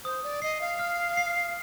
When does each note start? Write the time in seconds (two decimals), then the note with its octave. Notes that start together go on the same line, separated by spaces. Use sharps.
0.04 C5 D#6
0.23 D5
0.42 D#5 C7
0.61 F5
0.79 F6
1.17 C7